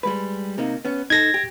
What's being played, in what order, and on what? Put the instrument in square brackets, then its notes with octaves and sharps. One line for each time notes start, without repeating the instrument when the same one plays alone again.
[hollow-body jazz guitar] G3 G#3 B4
C3 A#3 D#4
B3 C#4
[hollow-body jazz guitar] D#4 A4 [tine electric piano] G#6 A#6
[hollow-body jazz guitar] G4